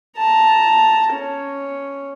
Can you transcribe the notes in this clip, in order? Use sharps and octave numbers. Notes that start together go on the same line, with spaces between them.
A5 A#5
C#4